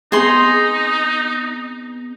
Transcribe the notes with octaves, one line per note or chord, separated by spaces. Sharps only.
B3 C4 D#4 G#4 C6